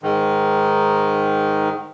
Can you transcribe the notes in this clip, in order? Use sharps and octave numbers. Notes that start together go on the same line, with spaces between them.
G#2 D#3